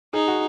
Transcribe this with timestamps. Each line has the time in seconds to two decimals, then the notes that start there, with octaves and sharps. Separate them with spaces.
0.13 D#4 G#4
0.28 F#4